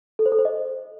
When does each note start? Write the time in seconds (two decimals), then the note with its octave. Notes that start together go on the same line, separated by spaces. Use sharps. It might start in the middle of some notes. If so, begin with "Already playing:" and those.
0.19 A4
0.26 C5
0.32 A4
0.39 C5
0.45 D#5